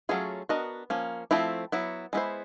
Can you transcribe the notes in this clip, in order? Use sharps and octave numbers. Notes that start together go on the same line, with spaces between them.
F#3 A3 C#4 F4 G#4
B3 D4 F#4 A#4 D#5
F3 A#3 C#4
F3 A3 C4 E4
F#3 B3 E4
G#3 B3 E4 A4 C5